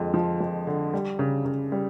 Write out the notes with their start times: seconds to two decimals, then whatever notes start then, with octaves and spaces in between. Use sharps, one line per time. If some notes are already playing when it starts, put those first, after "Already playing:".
Already playing: F2 D3 G#3
0.14 F3
0.41 F2
0.67 D3
0.94 G3
1.19 C#3
1.45 C#3
1.72 G3